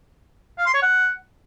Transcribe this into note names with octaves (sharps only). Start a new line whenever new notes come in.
F5
C6
C#5
F#5